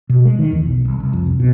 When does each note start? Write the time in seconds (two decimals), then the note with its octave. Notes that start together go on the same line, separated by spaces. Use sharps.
0.09 B2
0.25 G#3
0.39 D#3
0.52 E2
0.65 B1
0.85 C2
1.00 C2
1.13 F2
1.26 C2
1.40 B2